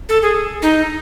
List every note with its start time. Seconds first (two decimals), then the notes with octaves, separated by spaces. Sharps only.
0.09 A4
0.22 G#4
0.62 D#4